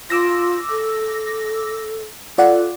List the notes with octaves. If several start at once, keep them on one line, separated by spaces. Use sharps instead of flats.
F4 D6 E6 A#6
A4
F4 A4 D5 F#5